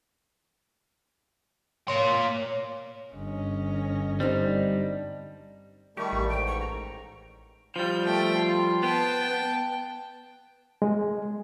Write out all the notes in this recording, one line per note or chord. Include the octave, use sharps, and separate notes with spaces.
A#3 C#5 C6
G1 C#4 D#5
G3 C4 D4 D#4
D#3 G3 A3 G4 C#6
A1
G#2 G5
C#6
A#5
F3 G3 G6
A3 G5
F4
B3 G5 A5
G#3